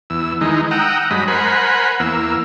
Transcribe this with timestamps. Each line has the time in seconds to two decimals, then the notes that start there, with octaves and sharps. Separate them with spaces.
0.10 E2 E6
0.41 D#3 E3 G#3 D#4
0.71 F#5 G5 A#5 D#6 E6
1.11 G2 F#3 G#3 D#5 B5
1.28 A#4 C5 F#5 G#5 B5
2.00 E2 A#3 E6